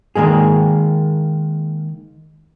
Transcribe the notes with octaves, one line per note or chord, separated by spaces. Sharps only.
D#3 G#3 A#3 G#4